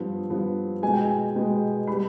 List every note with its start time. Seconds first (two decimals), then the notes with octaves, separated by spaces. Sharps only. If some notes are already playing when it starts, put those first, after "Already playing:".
Already playing: G2 F3 B3
0.30 G2 F3 B3
0.82 B2 G#3 B3 G#5
0.93 G5
1.05 G#5
1.36 B2 G#3 B3
1.87 G3 B3 B5